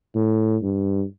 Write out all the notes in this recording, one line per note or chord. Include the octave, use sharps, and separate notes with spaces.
A2
G2